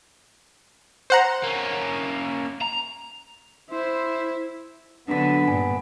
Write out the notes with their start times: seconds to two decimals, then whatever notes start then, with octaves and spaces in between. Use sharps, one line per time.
1.10 C5 F#5 A#5
1.43 A#3 C#4
2.62 A#5
3.71 E4 C5
5.08 D3 F#3 B3 D4 B6
5.48 G2 A#2 G#5